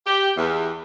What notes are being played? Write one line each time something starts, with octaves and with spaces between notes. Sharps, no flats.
G4
E2